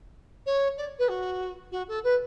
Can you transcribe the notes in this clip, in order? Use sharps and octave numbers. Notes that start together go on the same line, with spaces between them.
C#5
D5
B4
F#4
F#4
A4
B4